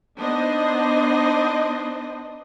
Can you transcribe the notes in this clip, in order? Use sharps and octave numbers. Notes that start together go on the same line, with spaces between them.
B3 D4 D#4 C5 D#5